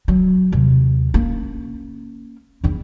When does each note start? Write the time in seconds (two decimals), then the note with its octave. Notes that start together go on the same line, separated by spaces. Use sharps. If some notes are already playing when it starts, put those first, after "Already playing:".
0.08 F#3
0.52 D#2 C3
1.14 A#3 C#4
2.64 E2 E4